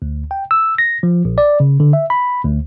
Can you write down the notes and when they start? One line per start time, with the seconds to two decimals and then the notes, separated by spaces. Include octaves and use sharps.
0.02 D2
0.31 G5
0.51 E6
0.78 A#6
1.03 F3
1.25 A#1
1.38 D5
1.60 C#3
1.80 D3
1.93 E5
2.10 B5
2.44 D2